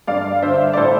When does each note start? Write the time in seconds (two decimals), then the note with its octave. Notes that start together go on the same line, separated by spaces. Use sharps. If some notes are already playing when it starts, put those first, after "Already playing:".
0.07 G2 D5 F5
0.42 D3 C5 E5
0.73 D5
0.77 A2 A4 C5